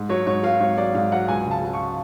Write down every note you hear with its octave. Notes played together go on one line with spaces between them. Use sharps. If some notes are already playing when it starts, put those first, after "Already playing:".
Already playing: G#2
F#3 C#5
G#2 C#5
F#3 F5
G#2 C#5
F#3 D5
G#2 F5
F#3 F#5
C#2 G#5
C#3
A5
F#3
C#6